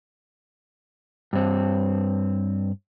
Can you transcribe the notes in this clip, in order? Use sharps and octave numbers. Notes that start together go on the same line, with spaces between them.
G2 C4